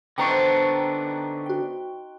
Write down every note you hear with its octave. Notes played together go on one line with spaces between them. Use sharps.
D3 B3 D4 D#4 C5 G5 A#5 C#6
F#4 G5